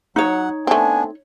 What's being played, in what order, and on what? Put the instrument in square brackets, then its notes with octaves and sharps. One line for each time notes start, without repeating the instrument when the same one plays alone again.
[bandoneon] F#3 F#5 [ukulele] D#4 C#5
[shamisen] A3 C4 [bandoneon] B3 D4 [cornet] G#5